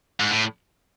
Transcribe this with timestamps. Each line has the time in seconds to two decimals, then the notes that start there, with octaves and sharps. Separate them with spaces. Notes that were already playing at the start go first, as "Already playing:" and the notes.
0.20 G#2
0.31 A2